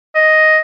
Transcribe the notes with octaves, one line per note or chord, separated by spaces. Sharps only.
D#5